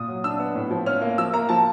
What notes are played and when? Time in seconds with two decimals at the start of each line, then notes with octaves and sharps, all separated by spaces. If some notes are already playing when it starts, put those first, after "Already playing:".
Already playing: A#2 D#6
0.08 F#3
0.24 D4 E6
0.39 B3
0.55 A2
0.71 F3
0.86 C#4 F6
1.02 A#3
1.18 F3 E6
1.33 A#3 A#5
1.49 F3 A5